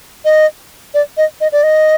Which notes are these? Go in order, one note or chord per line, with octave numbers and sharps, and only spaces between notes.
D#5
D5
D#5
D#5
D5
D#5